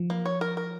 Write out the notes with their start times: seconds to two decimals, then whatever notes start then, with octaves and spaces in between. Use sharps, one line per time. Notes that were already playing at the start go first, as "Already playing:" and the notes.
Already playing: F3
0.10 A#3
0.26 C#5
0.41 A#4
0.57 A#4